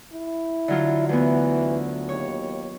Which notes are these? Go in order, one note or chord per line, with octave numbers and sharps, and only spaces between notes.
E4
D3 F#3 F4
D2 E3 B3
D#2 C#5